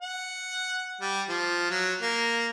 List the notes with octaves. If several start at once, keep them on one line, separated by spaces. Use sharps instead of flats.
F#5
G3
F3
F#3
A#3